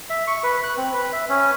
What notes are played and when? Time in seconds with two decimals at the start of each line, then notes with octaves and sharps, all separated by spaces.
0.10 E5
0.27 C#6
0.43 B4
0.64 F#6
0.78 C4
0.93 B4
1.13 E5
1.29 C#4